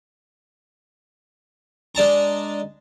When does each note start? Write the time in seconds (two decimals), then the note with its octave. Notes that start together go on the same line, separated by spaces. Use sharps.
1.95 G#3 D4 A5 A#5